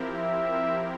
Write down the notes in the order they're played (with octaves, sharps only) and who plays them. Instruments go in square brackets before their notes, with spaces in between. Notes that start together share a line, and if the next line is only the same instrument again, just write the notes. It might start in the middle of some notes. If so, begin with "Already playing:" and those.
Already playing: [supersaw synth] F3 C4 E4 G4 A#4
[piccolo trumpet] E5